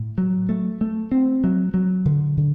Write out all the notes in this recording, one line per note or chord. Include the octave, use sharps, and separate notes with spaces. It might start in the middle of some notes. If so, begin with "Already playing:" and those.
Already playing: A2
F#3
A3
A3
C4
F#3
F#3
D3
D3